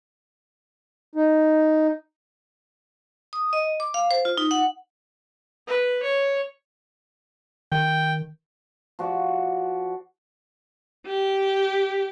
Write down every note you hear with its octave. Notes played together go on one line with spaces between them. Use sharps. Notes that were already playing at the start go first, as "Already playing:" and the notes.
D#4
D#6
D#5
D6
F5
C5
F4
D#4
F#5
B4
C#5
D#3 G5
F3 F#4 D5
G4